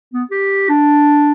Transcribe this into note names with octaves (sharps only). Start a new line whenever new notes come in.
B3
G4
D4